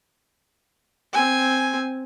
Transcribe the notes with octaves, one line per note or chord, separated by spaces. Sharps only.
C4 G#5